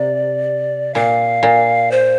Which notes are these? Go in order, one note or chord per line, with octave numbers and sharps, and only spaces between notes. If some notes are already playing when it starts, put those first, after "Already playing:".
Already playing: C3 D5
A#2 F5
A#2
C5